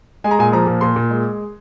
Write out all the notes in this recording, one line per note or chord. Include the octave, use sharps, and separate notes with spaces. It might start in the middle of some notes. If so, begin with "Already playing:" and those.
G#3 G#5
A#5
A#2 G#5
F3 A#5
A#2
A#2 C6
A#2
G#3